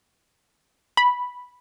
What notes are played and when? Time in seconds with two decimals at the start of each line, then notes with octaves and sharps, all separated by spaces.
0.97 B5